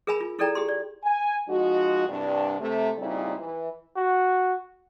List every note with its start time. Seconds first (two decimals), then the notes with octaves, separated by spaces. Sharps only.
0.07 G#4 A#4 E5 G#5 B5
0.21 F4
0.39 E4 G#4 A4 D5 G5 A#5
0.55 G4 G#4 C6
0.69 D5
1.04 G#5
1.48 F3 G#3 D#4 F#4
2.08 C2 G2 D4
2.60 C3 A3
2.97 A#2 C#3 G3 C4 D#4 E4
3.39 E3
3.96 F#4